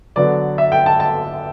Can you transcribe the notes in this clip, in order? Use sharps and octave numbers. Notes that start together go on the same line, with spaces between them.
D3 F#3 B3 D4 D5
E5
G5
A5
A5